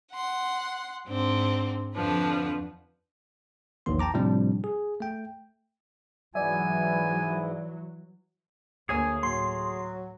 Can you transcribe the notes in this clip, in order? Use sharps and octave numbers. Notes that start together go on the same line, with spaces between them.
F#5 C6
G#2 C4 D4
F2 D3 F3 D4 B4
A#1 E2 D#3 A#3 C6
G5 A5 A#5 D6
A2 C3 F3 G3 C4 D4
G#4
A3 G5
G#2 E3 F#3 B3 E4 D5 E5 G#5
D2 A#3 G#4 C#5 G#5 D#6
A2 F#3 C6